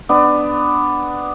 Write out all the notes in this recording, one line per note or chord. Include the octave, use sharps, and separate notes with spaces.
B3 D4